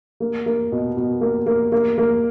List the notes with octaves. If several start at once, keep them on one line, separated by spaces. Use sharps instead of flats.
A#3
A#3
B2
B2
A#3
A#3
A#3
A#3